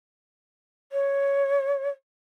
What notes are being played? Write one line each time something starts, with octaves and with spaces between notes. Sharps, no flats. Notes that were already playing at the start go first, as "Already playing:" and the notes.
C#5